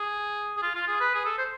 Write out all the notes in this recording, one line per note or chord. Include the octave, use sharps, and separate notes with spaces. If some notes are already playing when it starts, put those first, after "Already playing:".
Already playing: G#4
G#4
F4
F4
G#4
B4
G#4
A4
C5